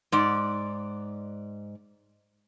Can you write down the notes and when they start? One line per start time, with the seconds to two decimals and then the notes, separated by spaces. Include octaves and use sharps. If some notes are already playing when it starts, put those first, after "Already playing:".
0.12 G#2 D5